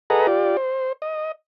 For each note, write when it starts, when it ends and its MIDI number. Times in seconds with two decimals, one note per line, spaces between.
0.10 0.27 68
0.10 0.27 69
0.10 0.27 71
0.10 0.27 75
0.10 0.27 78
0.10 0.27 82
0.27 0.57 65
0.27 0.57 67
0.27 0.57 74
0.57 0.93 72
1.02 1.32 75